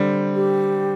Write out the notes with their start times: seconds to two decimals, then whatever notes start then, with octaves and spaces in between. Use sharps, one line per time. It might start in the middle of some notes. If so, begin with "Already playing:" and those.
Already playing: D3 G3 C4
0.35 G4